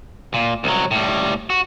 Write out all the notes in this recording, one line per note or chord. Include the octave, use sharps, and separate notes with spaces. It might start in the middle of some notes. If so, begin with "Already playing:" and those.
A#2
C2 F#3
A2 G3
F#4